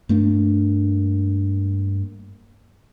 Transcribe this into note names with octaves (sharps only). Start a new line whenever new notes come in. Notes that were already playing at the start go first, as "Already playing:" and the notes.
G2 A3 A#3 D4